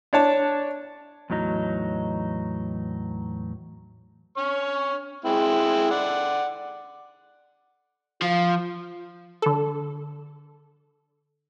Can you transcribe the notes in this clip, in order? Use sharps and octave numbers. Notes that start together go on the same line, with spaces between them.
D4 C#5 A5
E2 A2 F#3 D#4
C#5 C#6 F6
G#3 C4 E4
D5 F#5
F3 F4
D3 A4